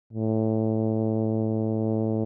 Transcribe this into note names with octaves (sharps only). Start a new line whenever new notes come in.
A2